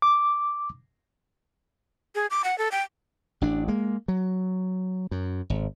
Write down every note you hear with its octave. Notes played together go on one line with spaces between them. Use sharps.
D6
G#4
D6
F#5
A4
G5
A1 D4
G#3 A#3
F#3
F#2
G#1